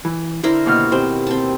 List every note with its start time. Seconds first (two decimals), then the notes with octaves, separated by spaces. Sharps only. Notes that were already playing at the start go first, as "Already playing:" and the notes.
0.05 E3
0.43 D3 E4 A#4 C5
0.66 D#2 B2 F6
0.92 C4 G4 C5
1.27 C4 A5